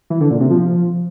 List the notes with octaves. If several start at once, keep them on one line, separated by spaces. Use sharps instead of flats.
E3
D3
A#2
C3
F3